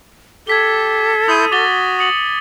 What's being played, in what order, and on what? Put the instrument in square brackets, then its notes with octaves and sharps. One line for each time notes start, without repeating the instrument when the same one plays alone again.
[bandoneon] G4 [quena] A4 [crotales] G#6 B6 G7
[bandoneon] E4 C6 G6 [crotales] D#6 D#7
[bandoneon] F#4 [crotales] D6 A6 G7
[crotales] D#6 C#7 F#7